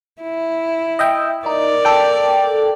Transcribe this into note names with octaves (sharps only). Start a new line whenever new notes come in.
E4
D#5 E5 G5
D#4 A#4 D5
A4 G5